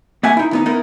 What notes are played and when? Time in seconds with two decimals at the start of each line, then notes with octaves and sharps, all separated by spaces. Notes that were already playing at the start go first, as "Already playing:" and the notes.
0.23 A#3 E5 F#5 G#5
0.37 D#4 E4
0.51 D#2 B3 D#4
0.66 B3 D#4 E4 A#4